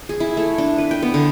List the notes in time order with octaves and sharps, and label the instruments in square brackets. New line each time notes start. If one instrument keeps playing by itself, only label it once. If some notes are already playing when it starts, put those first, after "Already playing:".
[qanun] G#4
E4
A3
D4
B4
G5
B3
D3